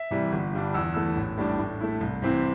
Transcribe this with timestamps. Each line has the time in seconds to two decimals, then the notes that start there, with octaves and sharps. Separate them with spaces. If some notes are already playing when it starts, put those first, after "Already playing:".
Already playing: E5
0.11 C3 E3 G3
0.32 G1
0.53 G2 G3 D4
0.74 E2 E6
0.94 E3 A3 E6
1.17 A1
1.37 A2 G3 D4
1.59 A2
1.80 A3 E4
2.01 C2
2.22 C3 E3 C4 E4